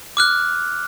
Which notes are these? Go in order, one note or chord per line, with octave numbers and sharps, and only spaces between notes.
D6 F6 F#6